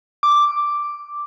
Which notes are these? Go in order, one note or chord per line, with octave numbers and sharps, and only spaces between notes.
D6